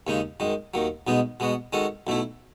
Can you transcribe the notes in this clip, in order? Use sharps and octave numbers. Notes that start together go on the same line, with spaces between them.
D#2 C#3 G#3 D#4
F#2 D#3 G#3
D#2 D#3 F#3
B1 B2 G#3 B3 D#4
B2 G#3 B3 F#4
D#3 G#3 C#4 F#4 A4
B1 B2 A3 E4